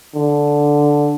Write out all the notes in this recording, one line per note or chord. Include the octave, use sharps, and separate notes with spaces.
D3